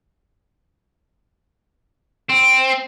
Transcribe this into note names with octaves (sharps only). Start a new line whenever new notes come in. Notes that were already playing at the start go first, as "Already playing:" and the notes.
C4